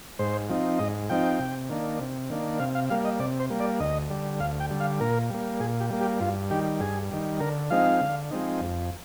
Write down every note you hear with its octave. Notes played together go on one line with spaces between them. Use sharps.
G#2 C5
F3 C4 D#4
G#2 D#5
F3 C4 D#4 G5
C3
D#3 A#3 D4
C3
D#3 A#3 D4
C3 F5
F5
G3 A#3 F5
D#5
C3 D5
C5
G3 A#3
D5
D2 D#5
D3 G3
D2 F5
G5
D3 G3
F5
A#2 A#4
G3 A#3
A#2 G#4
G4
G3 A#3
G4
G2 F4
D#3 G3 G4
G2 G#4
D#3 G3
D3 A#4
F3 G#3 C4 D#4 F5
D3
F3 G#3 C4 D#4
F2